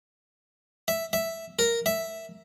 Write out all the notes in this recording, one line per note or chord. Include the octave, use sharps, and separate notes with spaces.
E5
E5
A#4
E5